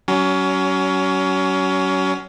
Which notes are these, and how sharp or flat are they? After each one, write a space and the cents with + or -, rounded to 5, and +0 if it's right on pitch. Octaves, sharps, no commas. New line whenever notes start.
F#3 +35 C#4 +20